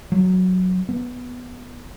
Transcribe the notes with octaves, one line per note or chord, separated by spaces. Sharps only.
F#3
B3